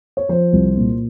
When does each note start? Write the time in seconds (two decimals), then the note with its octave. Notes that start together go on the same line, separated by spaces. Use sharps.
0.17 C#5
0.29 F3 C5
0.53 C2
0.77 A#2